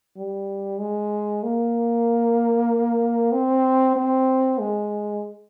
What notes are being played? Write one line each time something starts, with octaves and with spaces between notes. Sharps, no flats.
G3
G#3
A#3
C4
C4
G#3